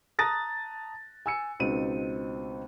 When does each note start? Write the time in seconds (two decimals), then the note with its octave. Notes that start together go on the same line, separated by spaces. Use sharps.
0.19 A5 A#5 D#6 F#6 A6 A#6
1.26 G#5 E6 C#7
1.60 C#2 B2 C4 D#4 D#7